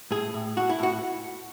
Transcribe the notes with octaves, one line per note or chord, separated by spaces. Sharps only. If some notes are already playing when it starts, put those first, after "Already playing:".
A2 G#4
A2
A2 F#4
E4
A2 F#4